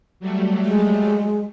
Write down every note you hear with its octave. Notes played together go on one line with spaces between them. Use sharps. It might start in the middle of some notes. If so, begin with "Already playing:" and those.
F#3 G3 A3
G#3